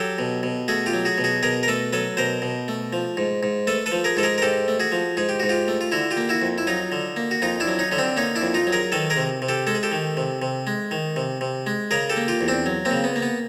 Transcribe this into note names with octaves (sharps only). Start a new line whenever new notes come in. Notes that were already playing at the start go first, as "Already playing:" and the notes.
Already playing: F#3 G4 A4
B2
B2
A3 F#4 G#4
F4 G4
F#3
F#4 G#4
B2
F#4 G#4
B2 G#4 A#4
A#4
A3 A4 B4
F#3 A4 B4
B2 A#4 C5
B2
A3
F3
G#2
G#2
A3 A4 B4
A4 B4
F3
G#4 A#4
G#2 A4
G#4 A#4
A#4
G#2 G4 A4
A3
F#4 G#4
F3
G#2 G#4
G4
G#2 F#4
F4 G4
A3
F4
D3 E4 F#4
F4 G4
A#3
E4 F#4
F2
E4
F#3 D#4 F4
D3
A#3
F#4
F2 D#4 F4
D4 E4
F#3
C#4 D#4
D3 C#4
C4 D4
A#3 C#4 D#4
D4 E4
F2
D#4 F4
F#3
G#4 A#4
D#3 A4 B4
G#4 A#4
C3
C3
G4 A4
G#3 A4
G#4
G4 A4
D#3
C3
C3
G#3
D#3
C3
C3
G#3
C#3 G#4 A#4
G4 A4
A#3
F4 G4
E2
C4 D4
F#3
A#3 C4
C#3
B3
A#3
B3